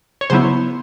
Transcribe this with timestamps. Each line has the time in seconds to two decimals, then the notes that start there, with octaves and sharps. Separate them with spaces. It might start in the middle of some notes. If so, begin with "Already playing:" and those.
0.21 C#5
0.30 C#3 F#3 B3 E4 C5